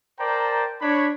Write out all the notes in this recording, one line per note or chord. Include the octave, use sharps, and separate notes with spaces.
A#4 C5 D5 G5 A5 A#5
D4 C#5 B5